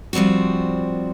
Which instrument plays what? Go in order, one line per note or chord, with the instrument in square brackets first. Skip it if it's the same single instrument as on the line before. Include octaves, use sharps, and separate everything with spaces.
[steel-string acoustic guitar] F3 G3 C4 D4 F#4